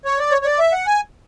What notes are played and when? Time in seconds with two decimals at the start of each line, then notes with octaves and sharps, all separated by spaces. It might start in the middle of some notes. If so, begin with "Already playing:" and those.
0.05 C#5
0.19 D5
0.32 C#5
0.42 C#5
0.45 D5
0.59 E5
0.72 F#5
0.87 G#5